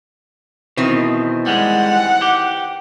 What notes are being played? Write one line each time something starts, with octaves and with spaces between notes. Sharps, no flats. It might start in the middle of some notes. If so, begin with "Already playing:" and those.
B2 D#3 E3 C4
G3 G#3 F#5
G4